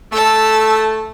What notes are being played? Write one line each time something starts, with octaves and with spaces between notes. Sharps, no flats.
A3 A5 E6